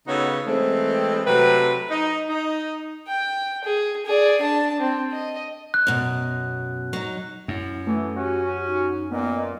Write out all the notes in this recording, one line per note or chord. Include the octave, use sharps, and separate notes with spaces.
C#3 B3 D#4 F#4 A4 C#5
E3 G#3 A3 C4
C3 F#3 A3 C4 B4
D#4
D#4
G5
G#4
G#4 D5
D4 A5
C4
D#5
F#6
F#2 B2
F#3 D#4
F#2 E4
E3 A3
C#4 F#4 G4
D#4
A#2 B3 D#5